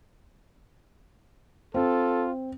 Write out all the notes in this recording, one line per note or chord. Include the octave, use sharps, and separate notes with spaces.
C4 F4 A4